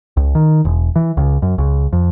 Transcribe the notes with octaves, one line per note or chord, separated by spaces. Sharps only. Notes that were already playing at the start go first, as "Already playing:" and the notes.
C#2
D#3
E1
E3
C#2
F#2
C#2
F2